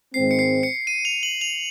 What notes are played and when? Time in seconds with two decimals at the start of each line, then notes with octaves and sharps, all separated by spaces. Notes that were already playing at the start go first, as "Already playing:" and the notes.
0.14 G#2 D#3 G#3 C4 C7
0.31 C#7
0.39 C7
0.63 C#7
0.87 D#7
1.05 F7
1.23 F#7
1.41 F7